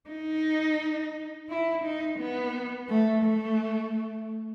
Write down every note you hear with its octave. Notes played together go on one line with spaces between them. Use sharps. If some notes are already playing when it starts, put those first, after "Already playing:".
D#4
E4
D#4
B3
A3
A3